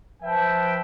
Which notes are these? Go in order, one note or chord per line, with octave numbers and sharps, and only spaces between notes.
F3 B4 E5 G5